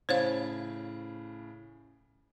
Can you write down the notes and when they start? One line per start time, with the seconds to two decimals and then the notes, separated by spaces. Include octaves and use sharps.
0.09 A2 C#3 C5 C#5 F5